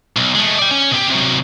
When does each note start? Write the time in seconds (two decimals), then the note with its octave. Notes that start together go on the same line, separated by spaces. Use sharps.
0.16 B1
0.35 G#3 A3
0.59 D5 G5
0.71 C#4
0.91 B2 G4
1.10 C3 F#3